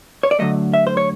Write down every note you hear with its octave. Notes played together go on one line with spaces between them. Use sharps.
C#5
D5
D3 F#3 A3 D#5
E5
C5
C#5